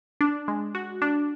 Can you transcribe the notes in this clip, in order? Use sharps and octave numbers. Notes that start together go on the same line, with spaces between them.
D4
G#3
F#4
D4